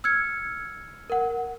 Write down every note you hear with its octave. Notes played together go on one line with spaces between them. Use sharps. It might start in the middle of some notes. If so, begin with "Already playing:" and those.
E6 F6 G#6 C#7
A#4 F#5